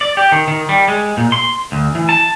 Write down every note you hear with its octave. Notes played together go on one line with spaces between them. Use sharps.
D5
G4
D#3
D#3
G3
G#3
A#2
C6
D2
E3
A5